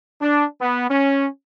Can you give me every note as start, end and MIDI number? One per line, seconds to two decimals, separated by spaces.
0.21 0.45 62
0.61 0.89 59
0.90 1.26 61